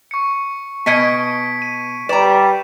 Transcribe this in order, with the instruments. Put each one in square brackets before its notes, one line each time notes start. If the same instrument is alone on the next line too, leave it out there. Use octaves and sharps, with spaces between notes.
[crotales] C#6 C#7
[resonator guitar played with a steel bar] B2 D#5 G#5 [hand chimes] B3 G#6 [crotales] B6 C#7 D7
[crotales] D#7
[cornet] G3 [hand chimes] B4 [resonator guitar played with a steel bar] D5 A#5 [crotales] E7